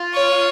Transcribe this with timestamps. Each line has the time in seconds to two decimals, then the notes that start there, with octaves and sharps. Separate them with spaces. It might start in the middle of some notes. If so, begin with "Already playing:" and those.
Already playing: F4
0.13 C#5